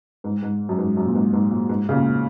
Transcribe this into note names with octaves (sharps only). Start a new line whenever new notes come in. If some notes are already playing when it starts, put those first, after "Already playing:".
G#2
G#2
F#2
G#2
F#2
A#2
G#2
G#2
A#2
G#2
C#3
A#2